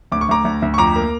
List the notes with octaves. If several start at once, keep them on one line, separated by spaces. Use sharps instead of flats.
D2 D6
C#6
D2 A#5 D6
D2
D2
C#6
F2 A#5 D6
A#3